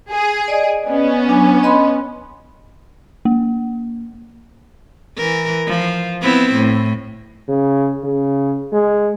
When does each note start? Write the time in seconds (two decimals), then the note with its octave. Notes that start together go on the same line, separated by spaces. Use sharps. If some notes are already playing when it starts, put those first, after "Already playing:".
0.11 G#4
0.48 D5 D#5
0.88 B3 C#4
1.28 F#3 D4 G#5
1.63 D#5 B5 C6
3.25 A#3
5.17 E3 A#4
5.66 F3
6.22 B3 C4 E4
6.53 A2
7.48 C#3
8.04 C#3
8.73 G#3